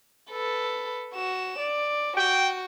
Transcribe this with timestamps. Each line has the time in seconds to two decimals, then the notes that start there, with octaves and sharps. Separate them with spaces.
0.31 A4 B4
1.15 F#4 E7
1.59 D5
2.17 F#4 G5